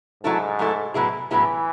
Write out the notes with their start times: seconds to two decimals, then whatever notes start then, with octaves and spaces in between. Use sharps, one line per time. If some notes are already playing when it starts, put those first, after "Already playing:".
0.23 G#2 F#3 A3 E4 A4
0.59 F#3 A3 E4 A4
0.94 A2 F#3 B3 E4 G#4
1.30 A2 E3 F#3 B3 E4 G#4